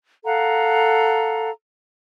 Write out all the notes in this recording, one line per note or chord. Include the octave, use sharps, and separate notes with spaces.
A4 F5 F#5 A#5